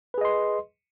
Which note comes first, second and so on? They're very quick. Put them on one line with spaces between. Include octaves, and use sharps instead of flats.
B4 G#4 D#5 C6